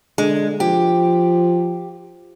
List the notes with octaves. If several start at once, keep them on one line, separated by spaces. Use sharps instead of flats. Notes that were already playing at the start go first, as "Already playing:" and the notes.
D3 G#3
F3 G4